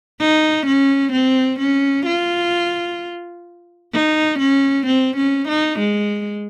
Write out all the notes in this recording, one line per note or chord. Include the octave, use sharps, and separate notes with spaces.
D#4
C#4
C4
C#4
F4
D#4
C#4
C4
C#4
D#4
G#3